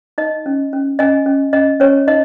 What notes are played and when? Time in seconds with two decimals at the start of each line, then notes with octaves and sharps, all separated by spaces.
0.18 D#4 D#5
0.46 C#4
0.73 C#4
0.99 C#4 D#5 G#5
1.26 C#4
1.53 C#4 D#5
1.80 C#4 C#5
2.07 D#4 D#5